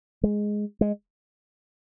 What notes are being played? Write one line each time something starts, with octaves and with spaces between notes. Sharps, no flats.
G#3
G#3